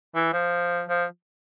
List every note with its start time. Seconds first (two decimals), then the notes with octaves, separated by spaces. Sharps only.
0.15 E3
0.33 F3
0.89 F3